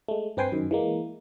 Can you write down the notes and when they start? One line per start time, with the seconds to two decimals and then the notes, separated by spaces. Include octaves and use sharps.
0.08 G#3 A3
0.37 G2 C4 B4 G5 G#5 C6
0.52 F#2 D#3
0.71 E3 G#3 A#3